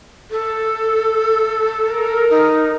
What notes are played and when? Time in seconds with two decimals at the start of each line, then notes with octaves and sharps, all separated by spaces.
0.31 A4
1.87 A#4
2.30 D#4